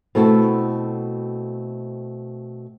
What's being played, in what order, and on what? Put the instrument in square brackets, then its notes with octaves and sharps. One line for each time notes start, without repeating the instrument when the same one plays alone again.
[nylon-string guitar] B2 A3 C4 E4 F#4 A4